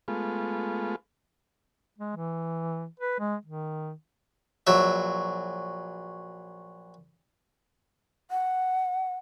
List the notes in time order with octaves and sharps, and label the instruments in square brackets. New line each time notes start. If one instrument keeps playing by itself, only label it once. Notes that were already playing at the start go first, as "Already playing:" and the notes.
[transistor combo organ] G#3 A3 B3 F4
[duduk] G#3
E3
B4
G#3
D#3
[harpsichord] A#1 F#3 E5
[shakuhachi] F#5